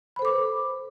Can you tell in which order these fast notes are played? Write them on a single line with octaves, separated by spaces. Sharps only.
B5 C5 A4 D6 B4